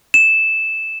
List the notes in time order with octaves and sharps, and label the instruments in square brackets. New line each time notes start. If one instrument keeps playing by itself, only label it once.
[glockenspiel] E7